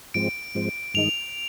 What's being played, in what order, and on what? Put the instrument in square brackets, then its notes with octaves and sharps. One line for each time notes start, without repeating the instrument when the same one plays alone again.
[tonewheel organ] G#2 F3 G#3 C4 [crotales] D7
[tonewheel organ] G#2 F3 G#3 C4
[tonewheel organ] G2 D#3 G#3 D#4 [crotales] F7